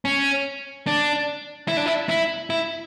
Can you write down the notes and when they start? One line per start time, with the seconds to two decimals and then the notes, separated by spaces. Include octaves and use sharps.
0.05 C#4
0.87 D4
1.68 E4
1.77 D4
1.86 E4
2.09 E4
2.50 E4